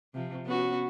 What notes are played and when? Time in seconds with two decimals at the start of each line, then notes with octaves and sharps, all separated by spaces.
0.14 C3 F3
0.46 B3 C#4 F#4